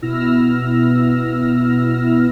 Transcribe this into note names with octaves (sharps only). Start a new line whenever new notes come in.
B2 B3 E4 E6 F6 A#6